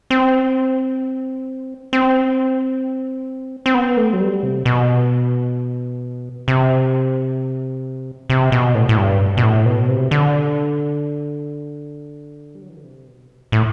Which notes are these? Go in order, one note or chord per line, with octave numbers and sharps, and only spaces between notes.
C4
C4
C4
B3
A3
F#3
G3
C3
B2
C3
C3
B2
A2
A2
G2
B2
A2
B2
C3
D3
G3
F#3
E3
D3
C3
B2
A2